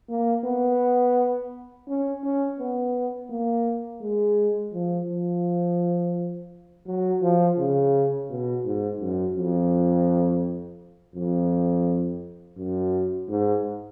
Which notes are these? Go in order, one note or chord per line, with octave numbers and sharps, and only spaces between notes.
A#3
B3
C#4
C#4
B3
A#3
G#3
F3
F3
F#3
F3
C#3
B2
G#2
F#2
F2
F2
F#2
G#2